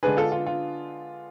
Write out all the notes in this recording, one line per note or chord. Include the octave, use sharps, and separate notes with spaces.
D3 G#3 B3 D4 G#4 B4
F4 A4
F4
F4